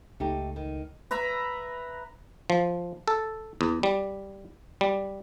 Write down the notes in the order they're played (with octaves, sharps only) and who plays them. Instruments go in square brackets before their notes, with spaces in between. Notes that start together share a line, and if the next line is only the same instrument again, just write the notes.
[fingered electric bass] C#2 [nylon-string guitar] A3 D#4 G4
[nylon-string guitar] D#3
[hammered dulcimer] B4 E5 A#5 B5
[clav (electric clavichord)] F3
A4
E2
G3
G3